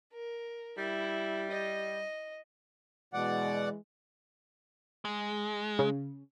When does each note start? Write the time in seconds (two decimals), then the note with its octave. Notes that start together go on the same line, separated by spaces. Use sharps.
0.13 A#4
0.78 G3 E4
1.51 D#5
3.14 B2 E3 G#3 D5 F#5
5.05 G#3
5.79 C#3